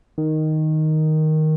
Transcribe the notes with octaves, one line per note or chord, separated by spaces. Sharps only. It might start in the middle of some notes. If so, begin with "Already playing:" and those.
D#3